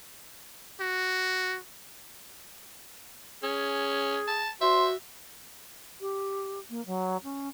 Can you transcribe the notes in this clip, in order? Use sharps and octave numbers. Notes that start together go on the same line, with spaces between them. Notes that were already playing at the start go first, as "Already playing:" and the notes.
F#4
C#4 G#4
A5
F#4 C5 E5
G4
A#3
F#3
C#4